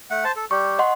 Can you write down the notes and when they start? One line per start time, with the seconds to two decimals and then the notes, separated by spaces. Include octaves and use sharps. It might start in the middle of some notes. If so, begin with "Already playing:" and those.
0.10 A3 F#5
0.24 C5 A5
0.36 A4
0.51 G3 G4 C#6
0.79 D#5 F#5 C6